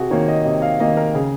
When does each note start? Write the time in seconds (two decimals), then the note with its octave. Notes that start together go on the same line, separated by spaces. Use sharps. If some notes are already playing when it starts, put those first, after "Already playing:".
Already playing: C3 F#4 G#4
0.10 D#3 A#3 C#5
0.28 D#5
0.45 C3 D#5
0.62 F5
0.80 D#3 A#3 D#5
0.97 A#4
1.14 C#3 G#4